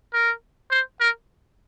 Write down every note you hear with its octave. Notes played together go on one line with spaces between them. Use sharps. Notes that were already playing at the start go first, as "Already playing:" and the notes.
A#4
C5
A#4